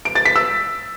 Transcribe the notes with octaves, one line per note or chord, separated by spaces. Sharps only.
D7
A6
B6
E6